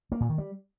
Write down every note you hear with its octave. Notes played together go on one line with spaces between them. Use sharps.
A#3
A#2
D#3
G3